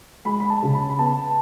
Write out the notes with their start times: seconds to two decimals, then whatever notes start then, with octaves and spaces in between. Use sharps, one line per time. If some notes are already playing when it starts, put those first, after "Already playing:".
0.25 G#3 B5
0.40 B5
0.50 A5
0.63 C#3
0.74 B5
0.89 B5
0.99 B3 A5